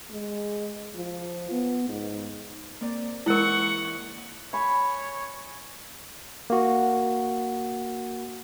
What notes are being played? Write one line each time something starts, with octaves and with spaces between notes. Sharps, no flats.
G#3
F3
B3
G#2
A#3 C4 D5
E3 G#3 E4 A#4 F#5 C#6
C#5 G#5 B5
A#3 F#4